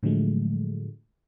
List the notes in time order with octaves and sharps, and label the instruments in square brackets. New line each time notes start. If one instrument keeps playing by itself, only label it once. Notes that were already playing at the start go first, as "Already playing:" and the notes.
[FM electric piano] A2 D3 F3 F#3 G#3 A3